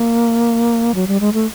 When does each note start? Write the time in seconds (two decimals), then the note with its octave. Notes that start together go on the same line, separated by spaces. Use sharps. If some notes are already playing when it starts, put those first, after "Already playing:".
Already playing: A#3
0.95 F#3
1.07 G3
1.20 G#3
1.33 A3